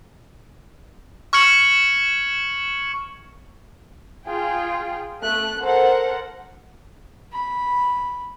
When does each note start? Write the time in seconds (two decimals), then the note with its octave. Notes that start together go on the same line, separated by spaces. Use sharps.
1.33 C#6 F6 G#6 C#7 F#7
4.25 F4 G#4 G5
5.21 A3 F#6
5.63 A4 A#4 C5 F#5
7.33 B5